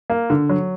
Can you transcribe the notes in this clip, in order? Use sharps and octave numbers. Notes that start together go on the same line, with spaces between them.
A#3
D3
F#3